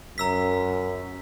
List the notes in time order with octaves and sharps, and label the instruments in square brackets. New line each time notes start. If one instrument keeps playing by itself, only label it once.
[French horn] F#2 [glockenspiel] A#5 E6 B6